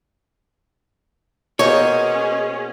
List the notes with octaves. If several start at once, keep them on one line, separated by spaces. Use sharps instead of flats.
B2 A#3 C#4 G#4 C5 C#5 D#5 G#5